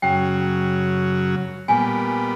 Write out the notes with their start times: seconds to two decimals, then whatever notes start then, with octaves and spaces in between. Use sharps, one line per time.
0.02 F#2 C#3 F#3 G5
1.68 A#2 G3 B3 G#5